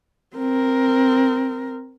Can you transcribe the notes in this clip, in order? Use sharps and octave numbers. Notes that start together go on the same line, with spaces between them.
C4 A#4